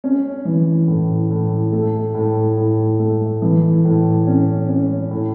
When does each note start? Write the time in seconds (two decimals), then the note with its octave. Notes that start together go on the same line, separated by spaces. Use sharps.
0.04 C#4
0.45 E3
0.88 A2
1.31 A2
1.72 A3
2.14 A2
2.57 A2
2.99 A3
3.42 E3
3.85 A2
4.27 C#4
4.68 C#4
5.11 A2